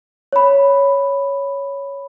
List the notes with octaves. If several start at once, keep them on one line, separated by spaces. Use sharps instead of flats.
C#5 B5